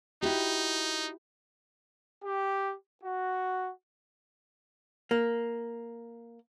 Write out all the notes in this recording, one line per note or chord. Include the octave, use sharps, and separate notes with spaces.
D#4 E4 F#4 G4
G4
F#4
A#3